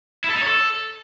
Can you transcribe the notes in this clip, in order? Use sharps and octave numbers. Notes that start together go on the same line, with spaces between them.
E4
A4
D#4
C#5
A4